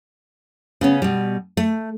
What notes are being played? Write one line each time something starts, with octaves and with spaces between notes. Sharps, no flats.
C#3 B3 C#4
B2 G3
A3